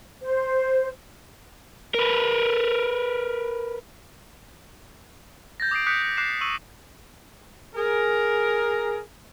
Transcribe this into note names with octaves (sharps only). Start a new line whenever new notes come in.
C5
A#4 B4
G6 A6 A#6
D6 D#6 G6 C7 D7
D6 D#6 F#6 G6 B6 C#7
G6 C#7
D6 F#6 C7 E7
C#6 E6 D#7 F#7
G#4 A#4